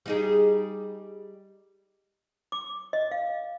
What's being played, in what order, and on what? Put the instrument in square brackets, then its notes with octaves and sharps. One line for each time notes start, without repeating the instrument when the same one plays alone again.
[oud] G3 D#4 G#4
[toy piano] D6
D#5
F5